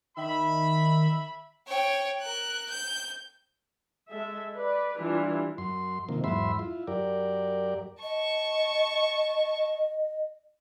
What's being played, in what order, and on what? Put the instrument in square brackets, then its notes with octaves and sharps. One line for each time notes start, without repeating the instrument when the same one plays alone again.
[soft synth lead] D#3 [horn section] E5 B5
[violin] C#5 G5
A#4 F#6
G6
[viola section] G#3 A4 E5
B4 D5
E3 G3 D4 E4 F4
[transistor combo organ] F#2 C6
C3 D#3 F3 A#3
E2 G#2 F#3 E5 B5 C6
E4 F4
F#2 G4 A#4 D5
[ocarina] D#5 [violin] A5 C#6